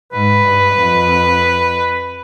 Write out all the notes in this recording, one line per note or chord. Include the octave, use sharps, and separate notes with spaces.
G#2 B4
G2
F2